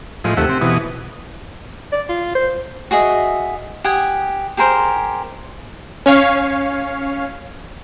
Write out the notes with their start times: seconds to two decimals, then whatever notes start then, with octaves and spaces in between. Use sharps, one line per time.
0.24 A2 F3 G#3
0.37 D#2 C3 A3 F#5
0.49 C4
0.61 B2 E3 D#6
1.92 D5
2.09 F4
2.35 C5
2.91 F#4 G#4 D#5 E5
3.84 G4 F#5 G#5 D#6
4.57 G4 G#4 A#4 C5
6.06 C#4 C#5 F5